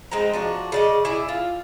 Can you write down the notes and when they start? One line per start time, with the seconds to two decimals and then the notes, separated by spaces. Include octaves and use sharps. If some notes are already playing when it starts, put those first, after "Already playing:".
0.11 G#3 C4 D#4 A#5
0.33 F3 D4 F#4
0.72 C#3 D5 D#5
1.05 E4 G#4 D5
1.29 F4